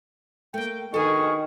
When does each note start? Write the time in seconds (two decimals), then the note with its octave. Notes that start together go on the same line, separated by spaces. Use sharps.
0.54 A3 A#3 G5
0.94 B2 D#3 D4 G#4 A4 G#5 C#6